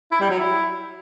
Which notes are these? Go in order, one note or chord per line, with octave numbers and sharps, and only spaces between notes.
E4
G3
F#3
E4